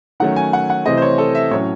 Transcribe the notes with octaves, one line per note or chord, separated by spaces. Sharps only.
D#3 F#3 A3 C#4 F#5
G#5
F#5
F#5
C3 E3 A3 C4 D#5
C5
C#5
A4
E5
A2 F#3 C#4 C#5